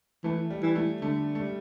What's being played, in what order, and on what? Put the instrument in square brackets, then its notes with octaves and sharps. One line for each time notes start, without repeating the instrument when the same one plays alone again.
[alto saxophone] E3 [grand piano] A3
[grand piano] G3
[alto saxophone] E3
[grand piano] A3
[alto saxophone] D3 [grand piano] A3
[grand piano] A3
G3